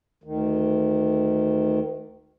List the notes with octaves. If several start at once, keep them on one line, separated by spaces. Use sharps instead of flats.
D2 D#3